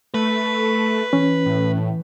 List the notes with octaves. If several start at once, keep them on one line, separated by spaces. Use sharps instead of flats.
A3 B4
E3 C#4
A2